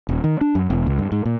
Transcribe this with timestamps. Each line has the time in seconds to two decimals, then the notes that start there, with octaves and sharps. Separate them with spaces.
0.09 D#1
0.24 D#3
0.41 D4
0.55 F#2
0.70 E1
0.87 C#2
0.99 G2
1.12 G#2
1.25 A#2